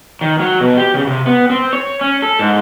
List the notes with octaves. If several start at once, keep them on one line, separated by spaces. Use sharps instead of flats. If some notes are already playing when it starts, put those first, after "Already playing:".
D#3
F#3
B2
G4
C#3
C3
B3
C4
C#5
C#4
A4
G#2